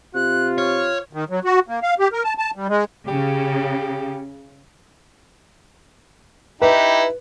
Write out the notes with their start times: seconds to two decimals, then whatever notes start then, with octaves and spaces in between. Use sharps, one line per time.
0.15 C3 F4 F#6
0.58 C#5 F6
1.13 D#3
1.30 F#3
1.45 F#4
1.68 A#3
1.82 F5
1.99 G4
2.13 A#4
2.24 A5
2.38 A5
2.56 G3
2.68 G#3
3.08 C#3 G4
6.62 D#4 E4 G4 B4